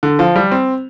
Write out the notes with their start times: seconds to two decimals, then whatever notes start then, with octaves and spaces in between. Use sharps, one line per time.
0.03 D3
0.19 F3
0.36 G3
0.52 C4